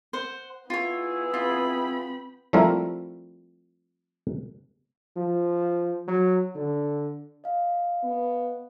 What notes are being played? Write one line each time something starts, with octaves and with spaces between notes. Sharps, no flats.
C5 F#5
B3 E4 F4 G#4 C#5
C4 F4 B5
F3 G3 A3 C4 E4 A#4
F3
F#3
D3
D#5 F5
B3